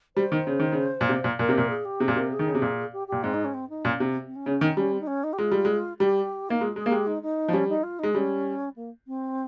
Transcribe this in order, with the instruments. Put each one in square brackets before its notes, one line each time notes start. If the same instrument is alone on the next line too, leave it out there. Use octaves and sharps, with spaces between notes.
[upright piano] G3 [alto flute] C5
[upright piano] D#3
C#3
D#3
C#3
A#2
C3
A#2
[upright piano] A#2 [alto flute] A#4
[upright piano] C3
A#2
[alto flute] G#4
G4
[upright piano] C3 [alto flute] G#4
[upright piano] A#2
[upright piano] C3 [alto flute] A#4
[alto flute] G#4
[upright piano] D#3
C#3
C3
A#2
[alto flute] G4
[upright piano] A#2 [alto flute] G4
[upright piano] G#2 [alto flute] C4
[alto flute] D#4
C#4
C4
D#4
[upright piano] A#2 [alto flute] C#4
[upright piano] C3
[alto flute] C4
C#4
[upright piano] C#3
D#3
[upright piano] G3 [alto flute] C#4
[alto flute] C4
D#4
C#4
D#4
G4
[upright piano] G#3 [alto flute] F4
[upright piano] G3
G#3
[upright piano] G3 [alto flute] G4
[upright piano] A#3 [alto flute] D#4
[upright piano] G#3 [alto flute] F4
[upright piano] G#3 [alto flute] G#4
[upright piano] A#3
[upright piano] G#3 [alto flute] G4
[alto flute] D#4
D#4
[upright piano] F3
[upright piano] G3 [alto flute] C#4
[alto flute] D#4
F4
[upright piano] G#3 [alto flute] D#4
[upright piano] G3 [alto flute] C#4
[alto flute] A#3
C4